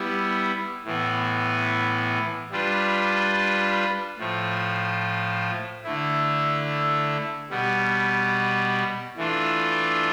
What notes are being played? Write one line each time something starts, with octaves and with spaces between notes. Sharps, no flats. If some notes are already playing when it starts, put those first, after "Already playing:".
Already playing: G3 B3 E4
A2 E3 B3
G3 D4 F4 B4
A2 F3 A3
D3 A3 E4
B2 G3 B3
E3 A3 D4 F4